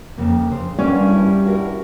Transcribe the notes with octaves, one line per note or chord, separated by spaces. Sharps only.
F2 C#3 A#3
C#3 C5
G2 C#4 F#4 A#4 D5
E4
E4 F#4 A#4